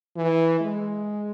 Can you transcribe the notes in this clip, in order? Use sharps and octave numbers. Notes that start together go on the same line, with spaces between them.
E3
G#3